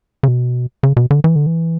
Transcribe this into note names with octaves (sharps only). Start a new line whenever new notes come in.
C#3
B2
C#3
B2
D3
E3
D3
E3